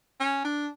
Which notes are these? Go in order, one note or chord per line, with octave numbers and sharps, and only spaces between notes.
C#4
D4